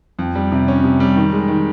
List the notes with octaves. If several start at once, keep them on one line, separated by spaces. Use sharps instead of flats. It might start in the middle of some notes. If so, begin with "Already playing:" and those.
F2
G3
C3
C#4
C3
G3
D#3
G#3
D#3